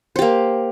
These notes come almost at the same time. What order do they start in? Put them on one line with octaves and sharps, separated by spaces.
C5 G4 A#3